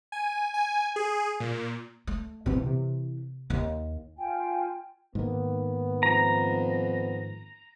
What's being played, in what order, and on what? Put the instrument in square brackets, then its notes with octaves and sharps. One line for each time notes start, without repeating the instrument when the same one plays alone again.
[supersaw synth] G#5
G#5
G#4
A#2
[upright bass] A3
[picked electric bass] G2 B2 C4 [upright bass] E3 E4
[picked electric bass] C3
[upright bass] D#2 D#3
[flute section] F4 G5 G#5
[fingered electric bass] G#2 D#3 A#3 [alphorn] B3
[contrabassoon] F2 [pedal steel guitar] A#5